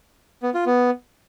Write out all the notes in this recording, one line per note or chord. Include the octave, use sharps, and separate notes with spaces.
B3
F4
B3